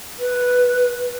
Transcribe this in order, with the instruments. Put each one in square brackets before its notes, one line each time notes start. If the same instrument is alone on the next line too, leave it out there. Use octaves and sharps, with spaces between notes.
[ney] B4